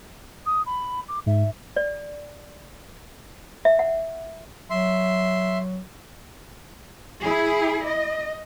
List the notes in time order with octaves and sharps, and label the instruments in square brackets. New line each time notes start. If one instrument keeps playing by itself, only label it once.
[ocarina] D#6
B5
D6
[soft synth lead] G#2 [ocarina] E5
[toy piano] D5
E5
F#5
[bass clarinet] F#3 [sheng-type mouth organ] E5 C6
[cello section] E4 G#4
D#5